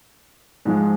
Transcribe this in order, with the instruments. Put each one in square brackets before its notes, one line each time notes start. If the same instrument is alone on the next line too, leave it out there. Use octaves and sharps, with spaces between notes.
[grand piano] G#2 F3 G#3